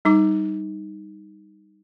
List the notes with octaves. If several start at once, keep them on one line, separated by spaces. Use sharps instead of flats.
G3 D#4 D6